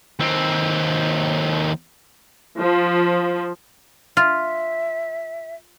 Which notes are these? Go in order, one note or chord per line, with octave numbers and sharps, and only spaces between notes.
D#2 C4
F3
F4 E5